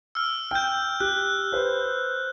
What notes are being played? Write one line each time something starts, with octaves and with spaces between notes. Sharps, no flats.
E6 F6
G5 F6 G6
G4 F#6
B4 C5